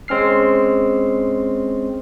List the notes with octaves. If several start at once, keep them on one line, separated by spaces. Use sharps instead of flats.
G#3 C4 C#4 F6 C7